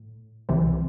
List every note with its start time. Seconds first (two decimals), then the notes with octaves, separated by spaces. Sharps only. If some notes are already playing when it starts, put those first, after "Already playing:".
Already playing: A2
0.49 C2 C3 E3